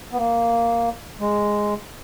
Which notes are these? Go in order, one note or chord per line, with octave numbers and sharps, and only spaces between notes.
B3
A#3
G#3